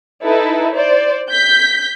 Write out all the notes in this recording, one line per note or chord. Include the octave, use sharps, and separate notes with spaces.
D#4 E4 A4 B4
C5 D5
G6 B6